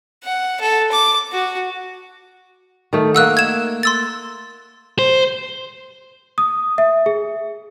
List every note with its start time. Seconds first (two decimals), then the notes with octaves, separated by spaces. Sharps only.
0.23 F#5
0.60 A4
0.91 D6
1.32 F#4
2.93 D#3 A3
3.15 A3 A#3 F#5 E6 F#6
3.37 G#6 E7
3.83 C6 E6 A6
4.99 C5
6.38 D#6
6.78 E5
7.06 G#4